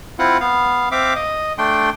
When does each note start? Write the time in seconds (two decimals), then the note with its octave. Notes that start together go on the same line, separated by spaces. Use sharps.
0.19 C4 E4 F4 F#5
0.41 B3 F5
0.92 C4 E5 F5 D6
1.15 D#5
1.58 A3 D4 G5 C6